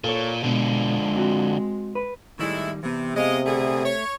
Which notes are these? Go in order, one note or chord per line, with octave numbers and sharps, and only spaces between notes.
A#2 A4 C#5
B2 D3 F3 G#3
C4 F#4
B4
A2 D#3 G3 G#3 E4
C3 E3 B3
C3 G#3 B3 D#5 F5
B2 D3 A3 G#4
C#5